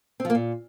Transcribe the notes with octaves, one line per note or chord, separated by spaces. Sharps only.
C4
F3
A#3
A#2